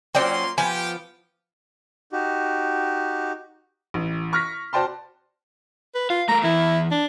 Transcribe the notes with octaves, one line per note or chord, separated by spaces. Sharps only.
F#3 A#3 C#4 F4 C5 D5 G5 C6
F3 B3 G4 G#5 B5
D#4 F#4 G4
A1
C#6 F6 A#6 B6
F#4 C5 D5 G5 A5 C6
B4
F4 F5
A3 A#4 A#5
E2 E3 E4
D4